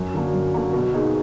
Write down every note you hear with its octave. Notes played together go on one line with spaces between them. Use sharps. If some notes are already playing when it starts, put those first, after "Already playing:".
Already playing: F#2
D3 F#3 A#3
F#2
D3 F#3 A#3
B2
A#3 D#4 G#4